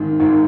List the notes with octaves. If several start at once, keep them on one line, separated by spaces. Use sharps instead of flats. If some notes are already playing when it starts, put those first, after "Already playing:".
Already playing: G#1 G#2 D#3
G#1 G#2 D#3